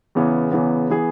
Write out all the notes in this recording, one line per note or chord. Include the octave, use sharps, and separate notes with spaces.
E2 C#3 E3 B3
E2 C#3 E3 B3
E3 B3 G#4